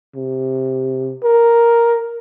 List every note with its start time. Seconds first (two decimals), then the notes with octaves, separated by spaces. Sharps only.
0.16 C3
1.24 A#4